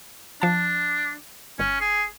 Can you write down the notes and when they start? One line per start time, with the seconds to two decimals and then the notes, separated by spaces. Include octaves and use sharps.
0.42 F3 D4 A5
1.59 G1 C#4
1.80 G#4